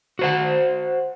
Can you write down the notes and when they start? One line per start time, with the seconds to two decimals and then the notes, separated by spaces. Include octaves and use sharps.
0.19 F#4 C5 F#5